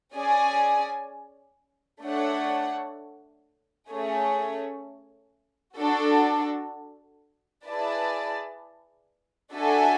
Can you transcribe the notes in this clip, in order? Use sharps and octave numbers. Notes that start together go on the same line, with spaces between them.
C#4 G#4 D5 G#5
A3 D4 A4 C#5 F#5
A3 C#4 G#4 C#5
D4 F#4 A4
E4 G#4 B4 D5 A5
D4 F#4 A4 E5 G#5